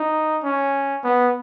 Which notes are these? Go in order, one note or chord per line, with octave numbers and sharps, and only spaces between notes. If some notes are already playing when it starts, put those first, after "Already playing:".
Already playing: D#4
C#4
B3